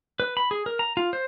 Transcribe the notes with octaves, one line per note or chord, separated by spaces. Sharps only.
B4
B5
G#4
A#4
A#5
F4
C5